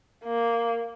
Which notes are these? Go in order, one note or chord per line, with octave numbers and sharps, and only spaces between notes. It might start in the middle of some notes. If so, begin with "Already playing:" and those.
A#3